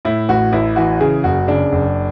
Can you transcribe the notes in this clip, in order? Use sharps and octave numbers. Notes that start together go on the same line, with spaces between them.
A2 E4
A1 F#4
A1 E4
E3 F#4
C#3 G#4
F#1 F#4
C#3 D4
F#1